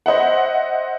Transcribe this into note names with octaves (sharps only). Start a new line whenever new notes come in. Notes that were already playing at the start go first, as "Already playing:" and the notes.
C5 D#5 E5 F#5